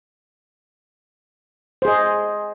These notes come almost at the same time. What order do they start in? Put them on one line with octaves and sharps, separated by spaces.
C5 G#4 D#5